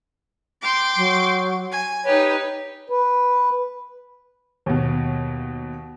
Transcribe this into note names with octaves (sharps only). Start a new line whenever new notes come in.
G5 C6 D6
F#3
G#5
D#4 G4 B4 C#5
B4
D#2 B2